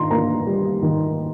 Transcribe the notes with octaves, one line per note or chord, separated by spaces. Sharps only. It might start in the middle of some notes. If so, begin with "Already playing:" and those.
Already playing: D#3 A#5 C6
A#3 A#5
G3
D#3